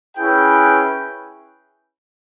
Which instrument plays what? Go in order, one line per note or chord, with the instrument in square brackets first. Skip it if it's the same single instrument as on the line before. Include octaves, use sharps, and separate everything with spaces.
[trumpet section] C#4 E4 G#4 B4 G5